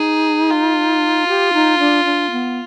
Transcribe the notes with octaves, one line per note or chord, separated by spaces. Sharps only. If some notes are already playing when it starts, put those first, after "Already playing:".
Already playing: D#4 G#4
F4
G4
D#4
D4
D4
B3